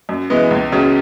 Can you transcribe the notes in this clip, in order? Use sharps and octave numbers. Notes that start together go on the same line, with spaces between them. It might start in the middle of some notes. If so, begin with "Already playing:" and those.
F#2
E3 G#3 B3
C#2
C#3 F#3 C#4